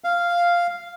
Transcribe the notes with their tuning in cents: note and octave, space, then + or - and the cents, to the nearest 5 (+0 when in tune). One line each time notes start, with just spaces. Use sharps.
F5 -5